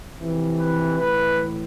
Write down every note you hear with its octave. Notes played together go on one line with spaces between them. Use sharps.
F2 C3 E3
B4
A2 E3 B4